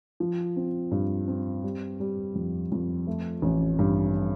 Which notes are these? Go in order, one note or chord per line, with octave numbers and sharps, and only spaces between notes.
F3
C4
G2
C4
G3
G3
F2
F2
A3
A1
G2